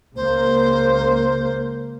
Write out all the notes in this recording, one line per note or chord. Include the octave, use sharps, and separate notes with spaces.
C#2 A#3 C5